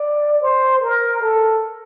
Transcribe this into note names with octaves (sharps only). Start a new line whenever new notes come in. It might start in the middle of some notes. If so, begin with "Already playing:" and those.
Already playing: D5
C5
A#4
A4